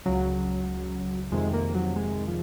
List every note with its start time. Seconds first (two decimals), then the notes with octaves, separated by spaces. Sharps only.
0.06 C#2 C#3 F#3
1.32 F2 C3 D#3 G#3
1.53 A#3
1.74 F#3
1.96 G#3
2.28 F3